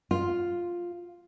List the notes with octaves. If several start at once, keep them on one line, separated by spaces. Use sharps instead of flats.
F4